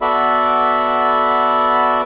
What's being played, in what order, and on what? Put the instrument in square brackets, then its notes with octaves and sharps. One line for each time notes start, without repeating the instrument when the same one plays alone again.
[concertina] B3 F#4 A4 D5 E5 B5